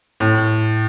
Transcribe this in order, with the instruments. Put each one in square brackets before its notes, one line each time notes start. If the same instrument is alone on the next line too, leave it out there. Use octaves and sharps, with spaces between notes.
[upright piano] A2